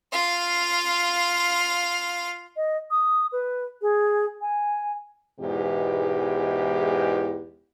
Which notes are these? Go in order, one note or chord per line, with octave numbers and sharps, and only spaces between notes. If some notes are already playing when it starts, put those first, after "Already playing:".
F4 F5
D#5
D#6
B4
G#4
G#5
E2 G#2 B2 E3 G#3 G4